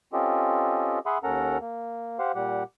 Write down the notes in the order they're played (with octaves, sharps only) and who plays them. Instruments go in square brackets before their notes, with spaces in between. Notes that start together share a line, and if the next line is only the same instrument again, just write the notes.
[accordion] C4 C#4 F4 G4 A4 D#5
G#4 E5 F#5 B5 C6 D#6
D#2 C#4 A4 A#4 F#5 A#5
A#3
G4 C5 F5 F#5
A#2 G3 G4 F#5